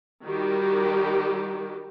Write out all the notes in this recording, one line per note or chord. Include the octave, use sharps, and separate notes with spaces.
D#3 G3 F#4 G4